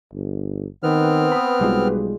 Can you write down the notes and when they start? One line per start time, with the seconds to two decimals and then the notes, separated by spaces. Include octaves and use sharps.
0.13 G1
0.83 D#3 B3 C4 B4 F6
1.32 B5 D#6
1.60 B1 G3 G#3 F4